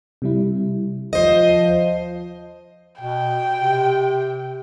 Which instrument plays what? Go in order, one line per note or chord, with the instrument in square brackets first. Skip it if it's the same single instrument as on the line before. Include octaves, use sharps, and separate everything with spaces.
[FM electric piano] C3 G3 E4
[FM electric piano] D#2 [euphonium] F3 [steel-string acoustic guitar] C5 D#5
[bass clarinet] B2 [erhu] G5
[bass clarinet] C3